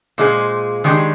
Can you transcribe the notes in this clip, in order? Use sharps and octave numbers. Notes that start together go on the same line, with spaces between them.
A#2 G#3 D#4 G#4 C5
D#3 G#3 D4 G4